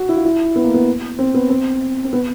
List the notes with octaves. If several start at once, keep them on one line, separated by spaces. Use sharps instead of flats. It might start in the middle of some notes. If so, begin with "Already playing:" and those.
Already playing: F#4
E4
F4
E4
B3
A#3
B3
C4
B3
C4
C4
B3